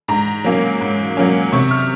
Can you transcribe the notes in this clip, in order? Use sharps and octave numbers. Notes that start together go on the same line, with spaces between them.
G#2 A#5
F#3 A#3 C#4
G#2
F#3 A#3 C#4
C3 C#6
F6